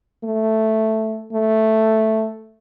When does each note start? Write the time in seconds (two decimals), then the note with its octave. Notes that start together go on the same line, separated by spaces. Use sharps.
0.24 A3
1.32 A3